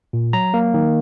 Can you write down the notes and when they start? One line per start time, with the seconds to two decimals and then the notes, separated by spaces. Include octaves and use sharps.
0.13 A#2
0.33 F#3 A#5
0.54 A#3
0.74 D#3